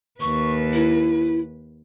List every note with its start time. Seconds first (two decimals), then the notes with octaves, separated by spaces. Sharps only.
0.21 D#2 B4 C#6
0.73 E4